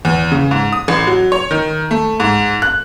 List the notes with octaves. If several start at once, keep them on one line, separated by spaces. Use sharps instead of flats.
E2
C#3
G#2
D#6
A1
F#3
C#5
D#3
A3
G#2
F#6